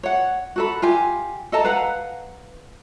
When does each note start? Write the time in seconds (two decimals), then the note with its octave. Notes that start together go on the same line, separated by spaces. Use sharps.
0.03 C#5 F#5
0.56 F#4 A4 B5
0.82 F4 G4 G#5
1.52 A4 D#5 A5 A#5
1.65 B4 F5 F#5 A#5